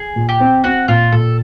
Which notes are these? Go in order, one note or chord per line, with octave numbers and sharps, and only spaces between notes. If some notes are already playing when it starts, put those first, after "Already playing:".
Already playing: G#4
A#2
G4
C4
C4 F#4
A#2 F4
A#2 A4